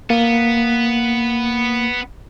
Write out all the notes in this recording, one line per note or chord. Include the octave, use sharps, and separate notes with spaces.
A#3 B3